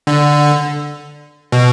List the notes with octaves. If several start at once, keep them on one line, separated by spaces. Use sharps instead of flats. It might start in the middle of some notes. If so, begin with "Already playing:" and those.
D3
B2